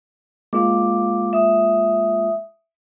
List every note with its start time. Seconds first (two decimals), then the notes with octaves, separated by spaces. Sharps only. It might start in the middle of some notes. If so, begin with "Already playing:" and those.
0.53 G#3 A#3 F4 F5 D6
1.33 E5 D#6